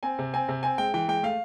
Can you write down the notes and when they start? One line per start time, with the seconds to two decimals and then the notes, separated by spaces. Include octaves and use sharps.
0.03 C4 G#5
0.19 C3
0.33 C4 G#5
0.48 C3
0.63 C4 G#5
0.78 G#3 G5
0.94 E3 G5
1.08 G#3 G5
1.23 A3 F5